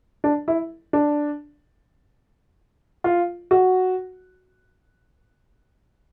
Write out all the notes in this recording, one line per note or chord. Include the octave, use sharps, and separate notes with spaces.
D4
E4
D4
F4
F#4